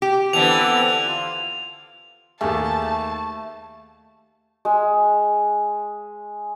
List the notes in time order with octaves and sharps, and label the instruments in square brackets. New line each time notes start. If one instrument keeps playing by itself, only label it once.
[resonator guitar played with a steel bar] G4
[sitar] D3 E3 [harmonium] B3 C4 A4 [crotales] F7
[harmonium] F4
[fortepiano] D#2 G4 G#4 [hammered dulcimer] A3 [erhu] A5
[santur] G#3 G#4